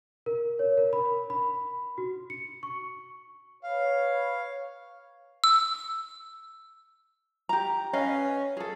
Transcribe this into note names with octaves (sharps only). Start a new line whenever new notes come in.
A#4
C#5
A#4
B5
B5
F#4
C#7
C#6
B4 C#5 F5
E6
G4 A#5
C#4 B4 D#5 F5
G#4 A4